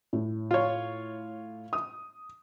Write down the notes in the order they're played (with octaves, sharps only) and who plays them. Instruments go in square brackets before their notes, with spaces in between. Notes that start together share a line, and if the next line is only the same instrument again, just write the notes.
[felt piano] A2
[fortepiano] F4 C#5
[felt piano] D#6